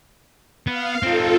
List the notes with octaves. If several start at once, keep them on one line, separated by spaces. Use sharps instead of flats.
B3 F5
C4 D#4 F4 A4